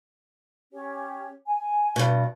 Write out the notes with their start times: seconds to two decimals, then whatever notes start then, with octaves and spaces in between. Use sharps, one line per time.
0.73 C#4 G4 C#5
1.46 G#5
1.96 G2 B2